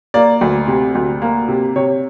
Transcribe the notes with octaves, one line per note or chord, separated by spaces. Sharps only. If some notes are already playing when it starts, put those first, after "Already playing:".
A#3 D5
D2
C3
D2
A#3
C3
C3 C#5